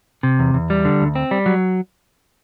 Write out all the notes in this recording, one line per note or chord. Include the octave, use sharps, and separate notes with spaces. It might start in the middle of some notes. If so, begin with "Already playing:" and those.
C3
E2
E2
G3
D3
D2
C4
G3
F#3